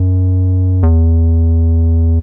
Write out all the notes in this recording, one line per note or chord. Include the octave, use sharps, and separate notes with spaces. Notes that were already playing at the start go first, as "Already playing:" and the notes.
Already playing: F#2
E2